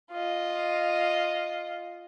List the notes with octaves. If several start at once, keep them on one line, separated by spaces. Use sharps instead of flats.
F4 D#5